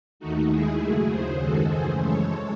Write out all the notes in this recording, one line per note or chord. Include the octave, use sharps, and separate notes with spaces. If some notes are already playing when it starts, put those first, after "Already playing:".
D#2 D#3 A3 D#4 F#4
D#2 D#3 G#3 E4 G#4
F#2 C#3 F#3 A3
D#2 C#3 F#3 G#4 C5
F#2 D#3 G#3 F#4 A4
F#2 C#3 E3 A3 G#4 C5
F#2 E3 G#3 A4 C#5